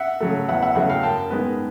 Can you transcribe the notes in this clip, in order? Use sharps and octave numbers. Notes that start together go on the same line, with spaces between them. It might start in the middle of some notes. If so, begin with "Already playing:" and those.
Already playing: E5 F#5
C#3 F#3 A3
E2 E5 F#5
E5 F#5
C#3 F#3 A3 E5 F#5
F5 G5
F#2 G5 A5
D#3 G#3 B3